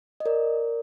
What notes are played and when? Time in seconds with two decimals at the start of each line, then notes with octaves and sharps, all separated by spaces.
0.20 D#5
0.26 A#4 D5